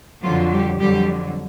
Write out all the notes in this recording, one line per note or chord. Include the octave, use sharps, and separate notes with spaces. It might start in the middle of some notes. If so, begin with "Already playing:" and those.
F2 D3 F3 F#3 F4
G3 G4
F2 D3 F#3 G3 G4